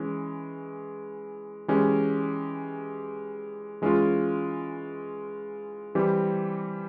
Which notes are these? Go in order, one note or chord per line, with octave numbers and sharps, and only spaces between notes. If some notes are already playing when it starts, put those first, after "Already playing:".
Already playing: E3 G#3 C#4
E3 G#3 C#4 G4
E3 G#3 C#4 F4
E3 G3 C4 G4